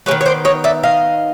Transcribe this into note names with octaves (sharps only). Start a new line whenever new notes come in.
D#3 G#3 B3 B4 C#5
C#5
C5 D5
C#5 D#5
D5 E5
D#5 F5